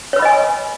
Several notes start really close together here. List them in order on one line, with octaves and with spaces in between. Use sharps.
C#5 B4 B5 D#5 G#5